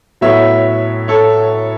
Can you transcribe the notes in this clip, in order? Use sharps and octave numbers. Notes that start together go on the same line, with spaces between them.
A2 F#3 B3 C#5 E5
A4 C#5